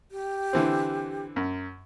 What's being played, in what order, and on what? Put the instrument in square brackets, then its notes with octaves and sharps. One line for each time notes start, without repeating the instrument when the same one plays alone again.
[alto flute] G4
[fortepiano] D3 E3 C4
F#2